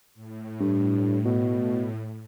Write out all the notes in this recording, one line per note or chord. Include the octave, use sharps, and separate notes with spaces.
A2
G2
B2